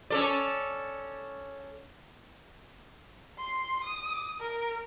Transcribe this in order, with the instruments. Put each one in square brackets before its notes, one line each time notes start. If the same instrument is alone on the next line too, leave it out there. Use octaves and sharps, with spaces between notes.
[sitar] C#4 A4 D5
[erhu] C6
D#6
A#4